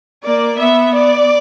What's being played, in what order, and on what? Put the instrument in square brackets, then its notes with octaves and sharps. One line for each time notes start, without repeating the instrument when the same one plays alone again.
[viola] A#3 [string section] D5
[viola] B3 [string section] E5
[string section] D5